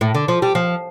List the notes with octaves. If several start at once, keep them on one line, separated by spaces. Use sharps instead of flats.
A2
D3
F3
G3
F3